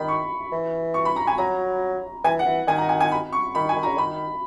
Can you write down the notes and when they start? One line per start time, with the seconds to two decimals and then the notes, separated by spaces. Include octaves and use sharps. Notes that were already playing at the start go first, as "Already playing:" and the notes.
Already playing: D#3 B5
0.08 C#6
0.52 E3
0.94 C#6
1.05 B5
1.16 A#5
1.27 G#5
1.38 F#3 A#5
2.24 E3 G#5
2.39 F#5
2.46 E3
2.67 D#3 G#5
2.78 A#5
2.89 G#5
3.01 G#5
3.12 B5
3.33 C#6
3.55 D#3 B5
3.69 G#5
3.76 D#3
3.83 A#5
3.86 C#3
3.96 D#3 B5